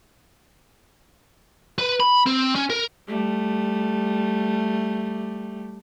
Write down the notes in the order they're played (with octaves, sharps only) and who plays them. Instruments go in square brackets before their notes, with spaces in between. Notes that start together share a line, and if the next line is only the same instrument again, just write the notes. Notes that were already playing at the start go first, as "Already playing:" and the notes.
[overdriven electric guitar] B4
B5
C4
C#4
A#4
[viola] G3 A3